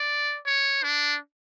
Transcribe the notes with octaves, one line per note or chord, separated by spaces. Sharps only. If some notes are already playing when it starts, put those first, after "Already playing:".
Already playing: D5
C#5
D4